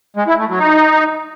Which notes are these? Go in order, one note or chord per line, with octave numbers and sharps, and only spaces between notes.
G#3
E4
A3
F#3
D#4